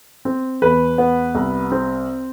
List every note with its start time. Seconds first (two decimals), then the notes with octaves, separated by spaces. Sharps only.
0.25 C4
0.62 E2 B4
0.98 B3
1.35 C2
1.72 C4